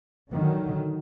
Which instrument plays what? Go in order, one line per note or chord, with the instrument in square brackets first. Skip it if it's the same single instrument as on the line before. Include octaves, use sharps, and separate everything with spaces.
[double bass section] D3 D#3 F#3